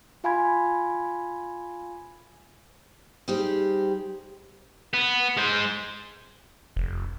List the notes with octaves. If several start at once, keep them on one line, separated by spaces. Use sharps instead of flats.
F4 F5 G#5 B5 C6 G#6
G3 D#4 G4 G#4 C5
B3
G#3 C5
F1